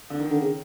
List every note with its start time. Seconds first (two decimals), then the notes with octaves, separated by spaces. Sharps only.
0.10 D3
0.20 D#3
0.31 D3
0.42 C#3